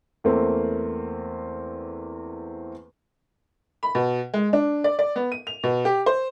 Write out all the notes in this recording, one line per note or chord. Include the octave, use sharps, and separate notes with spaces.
E2 A3 A#3 C4
B5
B2
G#3
D4
D5
D5
B3
D#7
F7
B2
G4
C5